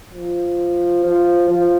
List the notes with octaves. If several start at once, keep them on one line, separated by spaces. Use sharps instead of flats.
F3
F3
F3